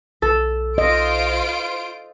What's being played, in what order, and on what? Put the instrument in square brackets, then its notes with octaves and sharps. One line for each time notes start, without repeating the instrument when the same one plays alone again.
[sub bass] B1 [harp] A4
[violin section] F4 C5 D7 [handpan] D#5